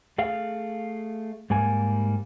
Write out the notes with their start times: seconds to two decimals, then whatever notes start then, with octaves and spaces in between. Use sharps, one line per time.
0.18 A3 G#4 F5
1.50 G#2 G3 A#3 G#5